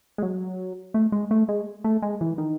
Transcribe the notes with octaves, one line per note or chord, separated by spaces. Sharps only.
G#3
F#3
A3
G#3
A3
G#3
A3
G#3
E3
D#3